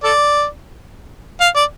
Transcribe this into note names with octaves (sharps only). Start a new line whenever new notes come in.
A4 D5
F5
D5